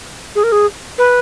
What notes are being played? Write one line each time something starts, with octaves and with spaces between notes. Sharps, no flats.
G#4
A#4
G#4
B4